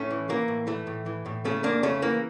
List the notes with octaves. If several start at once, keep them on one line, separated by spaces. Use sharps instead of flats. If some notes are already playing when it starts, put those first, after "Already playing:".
Already playing: A2 A3 C#4
E3
E3 A#3
A2
E3 A3
A2
E3
A2
C#3 A3 C#4
F2 A#3 D4
C#3 A3 C#4
E3 A#3